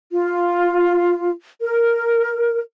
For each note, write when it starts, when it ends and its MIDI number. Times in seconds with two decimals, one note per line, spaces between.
0.10 1.30 65
1.61 2.60 70